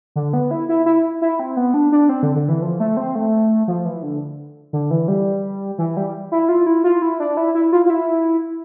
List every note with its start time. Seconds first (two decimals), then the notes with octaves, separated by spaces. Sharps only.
0.16 D3
0.33 B3
0.51 E4
0.69 E4
0.86 E4
1.22 E4
1.40 C4
1.57 B3
1.74 D4
1.92 D4
2.09 C4
2.23 D3
2.36 D3
2.49 E3
2.62 F3
2.80 A3
2.97 C4
3.15 A3
3.68 F3
3.85 E3
4.03 D3
4.73 D3
4.91 E3
5.08 G3
5.78 E3
5.97 G3
6.32 E4
6.49 F4
6.67 E4
6.84 F4
7.02 E4
7.20 D4
7.37 E4
7.55 E4
7.72 F4
7.86 F4
7.90 E4